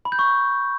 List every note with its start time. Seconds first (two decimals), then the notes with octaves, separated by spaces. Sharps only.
0.05 B5
0.12 G6
0.19 C#6